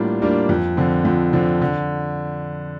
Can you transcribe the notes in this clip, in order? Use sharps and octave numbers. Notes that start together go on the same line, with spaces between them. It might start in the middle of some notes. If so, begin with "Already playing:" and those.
Already playing: A2 G3 A#3 D4 F4
G3 A#3 D4 F4
F2
D3 F3 C4
F2
D3 F3 C4
D3